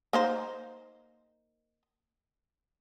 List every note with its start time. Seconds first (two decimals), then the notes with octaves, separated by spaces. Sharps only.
0.13 A#3 D#4 C5